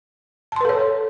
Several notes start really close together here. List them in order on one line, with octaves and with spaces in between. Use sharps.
A5 C6 B4 A4 C#5